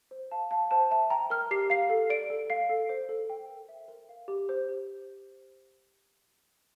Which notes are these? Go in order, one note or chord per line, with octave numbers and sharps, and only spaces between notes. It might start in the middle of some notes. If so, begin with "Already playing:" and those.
C5
F5 A5
F5 A5
C5 A5
E5 A5
G5 A#5
A#4 F6
G4 C7
F5 C7
A4
D5 D7
A4
F5 C7
A4
C5
A4
G5
A#4
E5
A#4
F5
G4
C5
G4